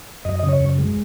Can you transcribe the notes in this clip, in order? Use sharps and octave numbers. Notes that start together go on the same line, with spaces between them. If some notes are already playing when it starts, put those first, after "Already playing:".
F#2 D#5
C#3 D#5
C#5
F#2
G#3